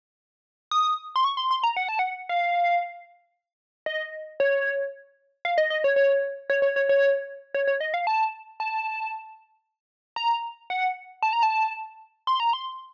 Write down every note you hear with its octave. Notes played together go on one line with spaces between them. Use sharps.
D#6
C6
C#6
C6
C6
A#5
F#5
A5
F#5
F5
D#5
C#5
F5
D#5
D#5
C#5
C#5
C#5
C#5
C#5
C#5
C#5
C#5
D#5
F5
A5
A5
A#5
F#5
A5
A#5
A5
C6
A#5
C6